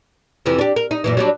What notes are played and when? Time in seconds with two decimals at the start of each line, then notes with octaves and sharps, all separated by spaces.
0.46 F2 C3 E3
0.59 D4 G4
0.76 A#4
0.91 D#4
1.04 F#2 A#2 E3
1.17 F#3 G3 D4